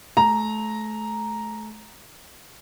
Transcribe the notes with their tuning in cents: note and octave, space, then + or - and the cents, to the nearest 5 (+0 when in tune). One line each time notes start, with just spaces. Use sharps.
A3 -30 A#5 +0